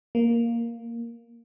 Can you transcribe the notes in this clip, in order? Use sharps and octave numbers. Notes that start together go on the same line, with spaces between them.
A#3